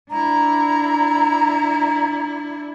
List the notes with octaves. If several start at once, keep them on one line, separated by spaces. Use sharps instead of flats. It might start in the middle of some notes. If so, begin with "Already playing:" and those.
D4 E4 A#5